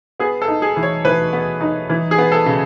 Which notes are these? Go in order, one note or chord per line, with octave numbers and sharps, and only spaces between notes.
B3 G#4
A4
D#4
G#4
E3
C#5
E3 B4
B3
D#4
E3
G#4
B3
A4
C#3